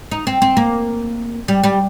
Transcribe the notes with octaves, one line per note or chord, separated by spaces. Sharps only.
D#4
C4
C4
A#3
G3
G3